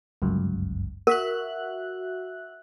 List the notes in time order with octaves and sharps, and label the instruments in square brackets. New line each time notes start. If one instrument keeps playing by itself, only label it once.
[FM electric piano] G1 C#2 F#2
[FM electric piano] F#4 E5 F#6 [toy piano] A#4